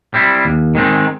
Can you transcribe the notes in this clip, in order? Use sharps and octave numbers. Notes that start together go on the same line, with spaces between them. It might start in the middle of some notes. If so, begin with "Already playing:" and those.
G3 C4 E4
D#2
D#3 G#3 C4 D#4